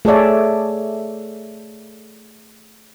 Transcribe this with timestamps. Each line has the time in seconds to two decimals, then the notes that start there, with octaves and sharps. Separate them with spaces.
0.05 A3 G#4 A4 C#5 D5 E5